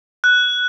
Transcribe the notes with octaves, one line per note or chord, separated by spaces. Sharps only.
F#6